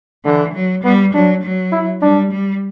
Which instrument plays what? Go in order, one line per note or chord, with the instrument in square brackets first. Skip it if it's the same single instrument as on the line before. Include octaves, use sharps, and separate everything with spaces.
[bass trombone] D3 [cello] E3
[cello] F#3
[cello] G3 [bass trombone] B3
[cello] F#3 [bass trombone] D4
[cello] F#3
[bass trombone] E4
[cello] G3 [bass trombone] D4
[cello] G3